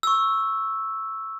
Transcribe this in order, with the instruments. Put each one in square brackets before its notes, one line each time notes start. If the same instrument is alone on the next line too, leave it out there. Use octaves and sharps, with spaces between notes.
[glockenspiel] C#6 E6